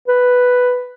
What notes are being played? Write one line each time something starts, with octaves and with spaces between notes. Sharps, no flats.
B4